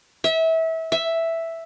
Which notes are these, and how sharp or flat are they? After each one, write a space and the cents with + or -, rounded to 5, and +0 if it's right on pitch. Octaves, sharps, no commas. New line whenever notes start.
E5 -25
E5 +0